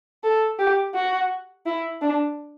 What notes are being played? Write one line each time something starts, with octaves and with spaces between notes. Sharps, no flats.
A4
G4
F#4
E4
D4